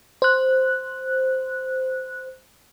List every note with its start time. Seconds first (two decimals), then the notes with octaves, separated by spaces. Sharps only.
0.22 C5 F#6